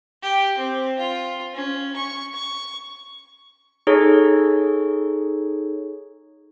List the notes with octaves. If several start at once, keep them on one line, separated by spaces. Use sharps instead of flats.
G4
C4
F4
C#4
C#6
C#6
D#4 G#4 A4 C#5